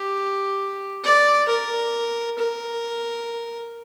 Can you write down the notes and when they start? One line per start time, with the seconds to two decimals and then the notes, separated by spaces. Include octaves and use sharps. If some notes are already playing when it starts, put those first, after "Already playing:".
Already playing: G4
1.05 D5
1.49 A#4
2.39 A#4